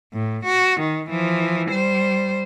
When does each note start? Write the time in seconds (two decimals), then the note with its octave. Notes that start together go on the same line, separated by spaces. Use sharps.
0.13 A2
0.45 F#4
0.80 D#3
1.09 E3 F3
1.69 G3 C5